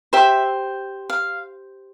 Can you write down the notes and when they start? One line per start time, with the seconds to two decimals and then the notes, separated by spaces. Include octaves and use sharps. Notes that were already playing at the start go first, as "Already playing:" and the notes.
0.13 G4 C5 E5
1.10 F5